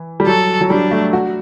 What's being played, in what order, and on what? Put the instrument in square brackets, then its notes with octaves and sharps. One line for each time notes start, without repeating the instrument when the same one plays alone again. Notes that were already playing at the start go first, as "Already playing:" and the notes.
Already playing: [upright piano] E3
G3
[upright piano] F#3 [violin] A4
[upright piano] F#3
[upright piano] G3 [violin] D4
[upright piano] A3
F#4